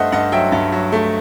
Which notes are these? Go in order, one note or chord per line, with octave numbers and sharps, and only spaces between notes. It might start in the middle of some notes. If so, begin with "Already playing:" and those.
Already playing: G2 A3 C5 D#5 E5 F#5
G2 D#5 F#5
F#3 E5 G5
G2
F#3
A3